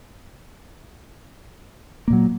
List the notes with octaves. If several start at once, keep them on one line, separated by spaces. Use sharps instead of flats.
A#2 F#3 A#3